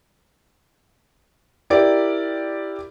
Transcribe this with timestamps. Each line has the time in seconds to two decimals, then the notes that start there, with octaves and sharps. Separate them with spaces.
1.70 E4 G4 A#4 D5